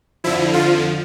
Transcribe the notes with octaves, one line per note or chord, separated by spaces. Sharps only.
F2 D3 F3 E4
F4